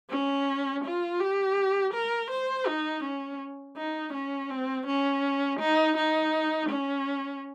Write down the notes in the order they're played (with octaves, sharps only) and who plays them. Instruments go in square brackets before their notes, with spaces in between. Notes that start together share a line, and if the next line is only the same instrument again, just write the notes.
[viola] C#4
F4
G4
A#4
C5
D#4
C#4
D#4
C#4
C4
C#4
D#4
D#4
C#4